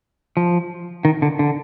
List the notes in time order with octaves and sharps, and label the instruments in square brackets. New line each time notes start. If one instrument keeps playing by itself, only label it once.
[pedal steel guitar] F3
D#3
D3
D3